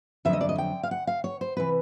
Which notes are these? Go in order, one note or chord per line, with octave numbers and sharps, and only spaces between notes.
F2 D3 F#3 E5
D#5
D5
D#5
G5
F5
F#5
F5
C#5
C5
C3 E3 B4